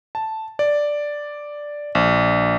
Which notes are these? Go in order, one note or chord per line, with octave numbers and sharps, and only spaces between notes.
A5
D5
A#1